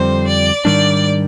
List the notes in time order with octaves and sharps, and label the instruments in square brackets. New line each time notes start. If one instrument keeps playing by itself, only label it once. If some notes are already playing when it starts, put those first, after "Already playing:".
Already playing: [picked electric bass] F2 D3 G3 C4 [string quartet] C5
[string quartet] D5
[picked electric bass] G#2 D#3 G3 D4 [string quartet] D5